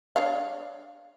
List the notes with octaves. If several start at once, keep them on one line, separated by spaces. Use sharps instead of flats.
D4 C#5 F5